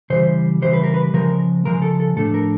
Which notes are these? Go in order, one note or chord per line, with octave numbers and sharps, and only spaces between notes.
C#3 E3 G3 C5
C#3 E3 G3 C5
B4
A#4
B4
C#3 F3 G#3 A#4
C#3 F3 G#3 A#4
A4
A4
A2 F3 A3 D4 A4
A#4